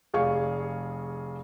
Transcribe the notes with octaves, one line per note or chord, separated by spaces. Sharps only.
F1 G#4 F5 C#6